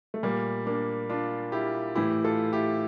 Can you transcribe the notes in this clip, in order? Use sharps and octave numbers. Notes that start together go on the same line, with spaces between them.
A3
A#2 G3 A#3
A#3 D4
D4 F4
E4 G4
A2 E3 E4 G4
F4 A4
E4 G4